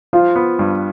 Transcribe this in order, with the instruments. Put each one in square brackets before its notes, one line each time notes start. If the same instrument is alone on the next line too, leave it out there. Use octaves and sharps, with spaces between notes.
[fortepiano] F3 [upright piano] F4
[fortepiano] B3
G2